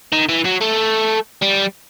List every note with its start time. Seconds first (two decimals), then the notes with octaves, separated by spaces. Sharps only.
0.12 D#3
0.29 E3
0.45 F#3
0.61 A3
1.42 G3